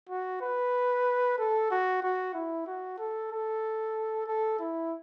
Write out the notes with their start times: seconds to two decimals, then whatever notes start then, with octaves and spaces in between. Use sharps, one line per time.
0.09 F#4
0.41 B4
1.39 A4
1.71 F#4
2.03 F#4
2.34 E4
2.67 F#4
2.98 A4
3.31 A4
4.27 A4
4.60 E4